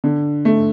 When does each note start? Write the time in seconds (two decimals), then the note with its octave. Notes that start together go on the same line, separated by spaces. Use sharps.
0.04 D3
0.45 A3